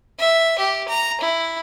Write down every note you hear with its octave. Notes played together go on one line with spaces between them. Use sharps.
E5
G4
A#5
E4